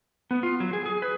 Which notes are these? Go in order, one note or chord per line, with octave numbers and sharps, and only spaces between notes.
B3
F4
F#3
G#4
G#4
B4